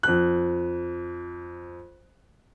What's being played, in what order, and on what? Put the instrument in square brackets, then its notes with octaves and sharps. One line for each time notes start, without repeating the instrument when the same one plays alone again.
[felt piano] F2 F#6